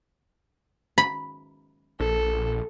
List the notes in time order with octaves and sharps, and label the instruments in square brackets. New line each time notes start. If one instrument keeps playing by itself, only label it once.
[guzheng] B5
[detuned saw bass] A#1 [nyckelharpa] A4